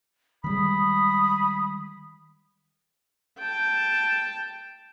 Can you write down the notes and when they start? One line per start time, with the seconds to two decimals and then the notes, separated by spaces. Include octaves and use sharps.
0.44 D#3 G3 G#3 B5 D#6
3.39 G5 A5